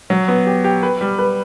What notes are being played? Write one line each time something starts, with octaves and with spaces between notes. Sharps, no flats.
F#3
B3
G4
G4
B4
G3
B4